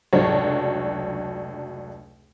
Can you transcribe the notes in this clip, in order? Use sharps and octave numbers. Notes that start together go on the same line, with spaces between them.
F1 C#2 F#3 D4 A4 C#5